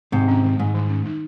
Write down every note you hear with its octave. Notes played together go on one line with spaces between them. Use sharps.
G#2 C3 D#3
C#4
D#3
G#2 G3
D#3
C#4
D#4